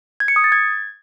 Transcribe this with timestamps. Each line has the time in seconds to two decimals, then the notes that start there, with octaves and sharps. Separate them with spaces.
0.20 G#6
0.28 C#7
0.36 D#6
0.44 A6
0.52 G#6